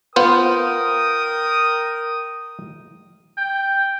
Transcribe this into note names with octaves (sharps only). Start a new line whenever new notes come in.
B3 F4 A#4 C5 G5 D#6
G5